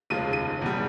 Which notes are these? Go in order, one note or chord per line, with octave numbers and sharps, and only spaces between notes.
F1 D#2 C#3 F3 G#3 D#7
D#7
E1 E2 B2 G3